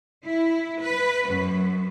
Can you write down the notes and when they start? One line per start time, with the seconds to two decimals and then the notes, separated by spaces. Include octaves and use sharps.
0.25 E4
0.81 B4
1.29 F#2